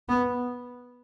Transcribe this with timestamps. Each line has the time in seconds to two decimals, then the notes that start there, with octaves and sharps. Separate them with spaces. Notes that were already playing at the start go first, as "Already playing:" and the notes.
0.09 B3